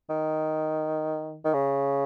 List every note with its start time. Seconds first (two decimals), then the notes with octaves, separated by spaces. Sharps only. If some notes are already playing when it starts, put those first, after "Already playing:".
0.10 D#3
1.45 D#3
1.54 C#3